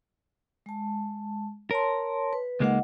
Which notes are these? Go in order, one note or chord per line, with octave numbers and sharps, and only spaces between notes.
G#3 A5
A#4 C#5 A5 C6
B4
C#2 G#3 A#3 D#4 D#5 F#5